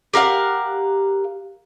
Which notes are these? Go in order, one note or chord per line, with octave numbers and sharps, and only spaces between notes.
G4 A#4 F5 F#5